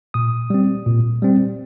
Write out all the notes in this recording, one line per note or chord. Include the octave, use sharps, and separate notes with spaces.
A#2 D#6
G3 C4
A#2
G3 C4